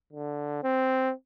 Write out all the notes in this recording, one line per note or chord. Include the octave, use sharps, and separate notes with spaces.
D3
C4